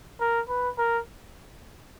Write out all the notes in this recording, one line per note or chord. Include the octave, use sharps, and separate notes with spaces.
A#4
B4
A#4